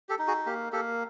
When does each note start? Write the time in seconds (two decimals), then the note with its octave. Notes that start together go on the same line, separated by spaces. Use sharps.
0.09 G4 A4
0.19 D#4
0.27 F#4 G#4
0.46 A#3 G4
0.72 A#3 G4 A4